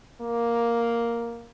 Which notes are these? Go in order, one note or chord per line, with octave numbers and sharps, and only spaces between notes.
A#3